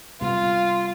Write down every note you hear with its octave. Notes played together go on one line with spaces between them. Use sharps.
C3 G3 B3 F4